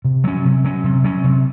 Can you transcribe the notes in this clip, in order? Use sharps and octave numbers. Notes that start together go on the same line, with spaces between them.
C3
F#3 C#4
C3
F#3 C#4
C3
F#3 C#4
C3